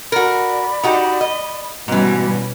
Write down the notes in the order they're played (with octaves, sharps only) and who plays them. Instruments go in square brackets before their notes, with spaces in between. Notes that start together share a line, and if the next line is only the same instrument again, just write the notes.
[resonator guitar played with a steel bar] F#4 A#4 [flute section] D5 B5
[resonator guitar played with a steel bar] D#4 F#4 G4
D#5
[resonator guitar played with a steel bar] G#2 E3 [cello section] B2 G3 C#4